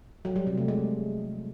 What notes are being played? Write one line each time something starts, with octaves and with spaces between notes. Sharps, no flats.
F#3
G3
C3
A3
G#3